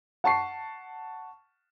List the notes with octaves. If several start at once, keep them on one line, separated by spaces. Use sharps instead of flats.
F#5 A5 C#6 C7